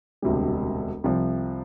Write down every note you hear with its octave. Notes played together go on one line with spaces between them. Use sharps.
E1 D2 C3 G3
C2 C3 F3